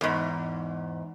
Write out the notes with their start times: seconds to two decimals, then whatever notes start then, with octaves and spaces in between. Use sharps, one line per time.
0.01 E2 G#2